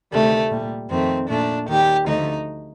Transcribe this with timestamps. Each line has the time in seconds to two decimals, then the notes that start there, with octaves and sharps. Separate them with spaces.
0.12 D2 C3 D#3 G3 A3
0.51 A#2 G3
0.90 F2 D#3 A3 C4
1.29 A#2 A3 D4
1.68 D#2 D#3 G3 G4
2.07 D2 D3 F3 A3 D#4